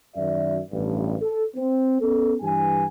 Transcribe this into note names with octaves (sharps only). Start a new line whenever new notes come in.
F#2 D#3 F#4 D5 E5
A1 G2
A4
C4
B3 C#4 A4
G2 E3 G4 G#5